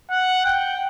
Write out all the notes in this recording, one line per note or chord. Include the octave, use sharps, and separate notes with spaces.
F#5
G5